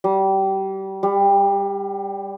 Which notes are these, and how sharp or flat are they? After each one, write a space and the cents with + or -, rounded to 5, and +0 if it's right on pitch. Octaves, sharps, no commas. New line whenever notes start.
G3 -25
G3 +20